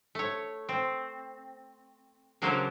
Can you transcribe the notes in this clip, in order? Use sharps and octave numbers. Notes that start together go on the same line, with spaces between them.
A3 C#5
C4
C#3 F#3 A#3 D4 A4 C5